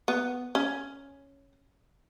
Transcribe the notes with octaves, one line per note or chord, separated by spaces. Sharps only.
B3
C#4